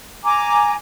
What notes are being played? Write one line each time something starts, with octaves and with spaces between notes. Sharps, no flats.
G#5 A#5 D6